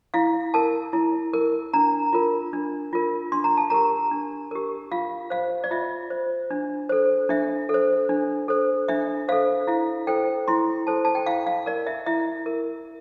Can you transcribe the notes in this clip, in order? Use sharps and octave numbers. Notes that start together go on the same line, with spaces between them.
E4 F5
A#4 A5
E4
A#4
D4 A#5
F4 A#4
D4
F4 A#4
D4 C6
A#5
A5
G4 A#4 A#5
D4
G4 A#4
F4 F5
C5 F5
D5
F4 E5
C5
D4
A4 C5
D4 E5
A4
C5
D4
A4 C5
D4 E5
A4 C5 F5
E4 F5
A4 C5 G5
E4 C6
A4 C5 A5
A5
G5
E4 F5
F5
A#4 D5
E5
E4 E5
A#4